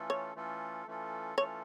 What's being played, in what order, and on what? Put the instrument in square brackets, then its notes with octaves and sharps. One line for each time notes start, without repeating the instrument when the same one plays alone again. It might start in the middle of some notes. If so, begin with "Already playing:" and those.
Already playing: [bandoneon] E3 A3 C#4 F4 A4
[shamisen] C#5
[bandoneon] E3 A3 C#4 F4 A4
E3 A3 C#4 F4 A4
[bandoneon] E3 A3 C#4 F4 A4 [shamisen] C#5